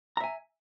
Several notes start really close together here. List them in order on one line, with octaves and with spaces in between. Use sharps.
A#5 E5 G#5